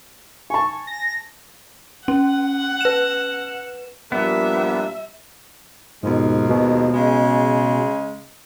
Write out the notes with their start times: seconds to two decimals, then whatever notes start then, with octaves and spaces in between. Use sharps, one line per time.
0.50 G#5 A5 C#6
0.87 A#6
2.08 C#4 F#5
2.81 B4 E7
4.12 A#2 F3 G3 A#3 B3 D4 E5
6.03 D#2 G#2 B2 F3 G#3
6.51 B2
6.93 C#3 G#3